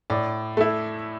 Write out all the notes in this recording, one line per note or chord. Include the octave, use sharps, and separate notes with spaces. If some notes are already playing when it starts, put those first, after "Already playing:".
A2 D5
A3 E4